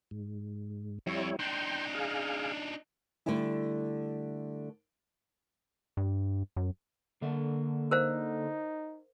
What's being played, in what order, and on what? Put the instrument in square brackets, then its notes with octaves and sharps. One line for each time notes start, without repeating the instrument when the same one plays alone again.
[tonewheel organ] G#2
[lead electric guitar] F2 [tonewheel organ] G3 E4 C#5
[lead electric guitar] D4 D#4 [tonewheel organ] G5 C6
[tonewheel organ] G#4 F5
[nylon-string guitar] D3 G3 A3 E4
[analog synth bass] G2
F#2
[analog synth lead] D3 [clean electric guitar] A#3 E5
[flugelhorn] D#4 [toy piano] A#4 C5 F5